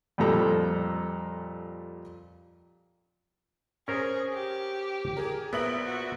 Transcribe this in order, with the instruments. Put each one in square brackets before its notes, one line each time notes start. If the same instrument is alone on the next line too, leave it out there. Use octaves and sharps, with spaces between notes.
[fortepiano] F2 A#2 G3 A4 A#5
[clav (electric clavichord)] C#4 A#4 C5 [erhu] G#4
[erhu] G4
[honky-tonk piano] G#4 A#4
[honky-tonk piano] A#1 E5 F#7 [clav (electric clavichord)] B3 [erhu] A#4
[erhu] F#4